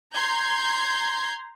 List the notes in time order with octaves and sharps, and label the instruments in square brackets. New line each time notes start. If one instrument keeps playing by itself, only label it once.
[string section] A#5 C6 G6 G#6